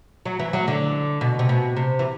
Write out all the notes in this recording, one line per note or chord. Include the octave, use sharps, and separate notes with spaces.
F#3
E3
F#3
D3
B2
C3
B2
C3
E3